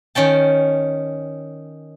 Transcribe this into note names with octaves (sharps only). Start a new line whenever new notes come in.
D#3 C#4 G5 A5